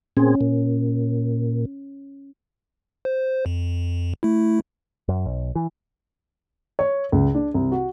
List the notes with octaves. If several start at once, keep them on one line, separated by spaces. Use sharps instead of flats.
A#2 C4 C#4 G#4
A#2
C5
F2
A3 E4
F#2
B1
E3
C#5
C#2
D4
C2
F#4